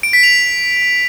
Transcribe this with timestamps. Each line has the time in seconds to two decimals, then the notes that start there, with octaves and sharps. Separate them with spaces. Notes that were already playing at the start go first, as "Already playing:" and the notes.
0.03 D7
0.13 B6
0.23 F7